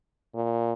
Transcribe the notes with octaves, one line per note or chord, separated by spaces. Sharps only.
A#2